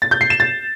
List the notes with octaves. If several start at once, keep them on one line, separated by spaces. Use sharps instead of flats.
A6
G6
C7
E7
A6